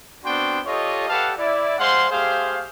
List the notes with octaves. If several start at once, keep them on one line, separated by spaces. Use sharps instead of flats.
B3 C4 D4 F#4 G5 C6
F4 G4 A4 C#5 D#5
G4 A4 B4 F5 F#5 A5
E4 D5
G#3 C5 F5 F#5 C6
A3 G4 G#4 C5 F5